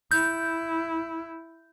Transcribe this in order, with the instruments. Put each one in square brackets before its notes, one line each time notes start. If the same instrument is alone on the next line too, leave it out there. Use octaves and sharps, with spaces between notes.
[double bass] E4 [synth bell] G6